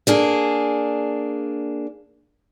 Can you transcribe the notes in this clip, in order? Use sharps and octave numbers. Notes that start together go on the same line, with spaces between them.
A#3 D4 G#4